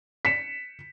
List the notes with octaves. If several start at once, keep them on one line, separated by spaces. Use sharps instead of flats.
B6 C#7 E7